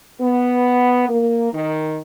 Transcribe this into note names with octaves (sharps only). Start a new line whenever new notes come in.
B3
A#3
D#3